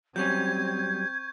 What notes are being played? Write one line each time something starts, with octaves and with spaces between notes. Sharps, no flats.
F#3 G3 C4 C#4 C#6 G6 G#6